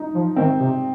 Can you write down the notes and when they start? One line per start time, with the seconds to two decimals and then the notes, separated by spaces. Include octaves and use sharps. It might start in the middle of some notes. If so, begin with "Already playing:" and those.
Already playing: D#4
0.14 F3
0.36 D#3 C4
0.60 C3